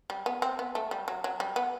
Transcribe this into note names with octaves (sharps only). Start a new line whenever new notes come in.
G3
B3
C4
B3
A3
G3
F#3
F#3
G3
B3